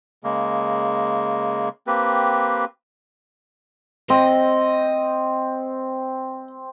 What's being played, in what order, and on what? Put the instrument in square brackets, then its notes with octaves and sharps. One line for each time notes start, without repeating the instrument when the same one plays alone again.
[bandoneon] C#3 G#3 A#3
A#3 C4 G4 B4
[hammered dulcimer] C4 [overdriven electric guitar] D#5